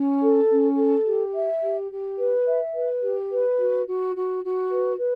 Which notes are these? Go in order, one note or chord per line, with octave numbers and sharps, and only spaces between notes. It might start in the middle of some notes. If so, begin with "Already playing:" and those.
Already playing: C#4
A4
C#4
A4
G4
E5
G4
G4
B4
E5
B4
G4
B4
F#4
F#4
F#4
F#4
B4
B4